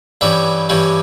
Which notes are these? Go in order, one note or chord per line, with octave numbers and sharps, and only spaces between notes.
G2 E3 G3 C#4 E5
G2 E3 G3 C#4